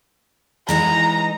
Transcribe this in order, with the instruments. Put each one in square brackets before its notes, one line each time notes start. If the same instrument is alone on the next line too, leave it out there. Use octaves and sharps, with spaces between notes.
[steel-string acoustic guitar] E3 G#3 D#4 [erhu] A#5